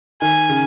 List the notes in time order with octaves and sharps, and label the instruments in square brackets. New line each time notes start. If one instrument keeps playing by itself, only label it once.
[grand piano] D#3 [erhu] G#5
[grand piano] C#3